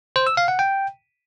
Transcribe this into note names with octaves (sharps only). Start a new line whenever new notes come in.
C5
E6
F5
F#5
G5